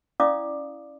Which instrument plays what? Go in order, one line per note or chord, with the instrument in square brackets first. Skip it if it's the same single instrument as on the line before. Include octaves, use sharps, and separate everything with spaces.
[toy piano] C#4 E4 D5 F5 D6 D#6